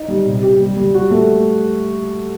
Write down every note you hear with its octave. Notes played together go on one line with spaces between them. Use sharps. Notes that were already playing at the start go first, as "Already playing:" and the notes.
Already playing: D#4
G3
C3
G4
G3
G3
F#4
A3